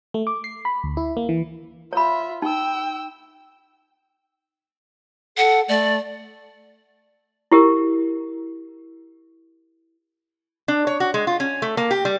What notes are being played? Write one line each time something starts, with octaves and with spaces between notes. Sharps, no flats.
A3
D6
C7
B5
D2
E4
A#3
E3
F4 C#5 E5 B5
D#4 G5 E6
A4 F#5
A3 D5
E4 G4 A#4
D4
C#5
F#4
G#3
F4
C#4
A3
A#3
G4
G3